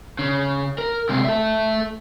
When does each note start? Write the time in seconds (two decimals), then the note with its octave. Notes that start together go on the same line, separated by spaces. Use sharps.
0.19 C#3
0.78 A#4
1.09 C3 G#3
1.24 A4 E5